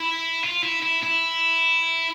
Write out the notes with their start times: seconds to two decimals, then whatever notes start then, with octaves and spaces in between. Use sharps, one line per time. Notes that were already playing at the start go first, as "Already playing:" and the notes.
Already playing: E4
0.43 F4
0.63 E4
0.82 E4
1.03 E4